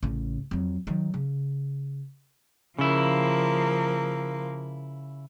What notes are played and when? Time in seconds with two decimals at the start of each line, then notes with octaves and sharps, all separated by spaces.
0.03 A1 C#3
0.51 F2 F#3
0.87 D#3 F#3
1.14 C#3
2.79 C#3 F3 A#3 E4